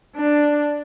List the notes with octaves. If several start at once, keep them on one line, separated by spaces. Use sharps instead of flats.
D4